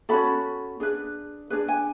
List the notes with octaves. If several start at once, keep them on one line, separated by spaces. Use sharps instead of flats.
C#4 F#4 A4 B5
D4 G#4 B4
D4 G#4 B4
G#5